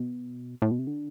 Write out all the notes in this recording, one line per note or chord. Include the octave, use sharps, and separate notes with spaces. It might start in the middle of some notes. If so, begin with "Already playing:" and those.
Already playing: B2
A2
B2
C3
D3